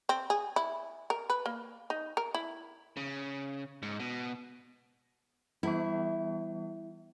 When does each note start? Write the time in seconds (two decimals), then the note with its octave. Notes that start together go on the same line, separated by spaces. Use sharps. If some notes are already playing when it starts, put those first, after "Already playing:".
0.09 C4
0.30 G#4
0.56 E4
1.10 A#4
1.30 B4
1.46 A#3
1.90 D#4
2.17 A#4
2.34 E4
2.97 C#3
3.82 G#2
4.00 B2
5.63 E3 G3 B3 E4